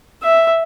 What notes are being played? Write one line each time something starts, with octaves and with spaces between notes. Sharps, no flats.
E5